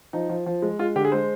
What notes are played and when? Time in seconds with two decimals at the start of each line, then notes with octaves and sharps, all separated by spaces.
0.13 F3 D#4
0.30 F3
0.46 F3
0.62 G#3
0.79 G#3 F4
0.96 D3 G4
1.04 G#4
1.12 G#3 C5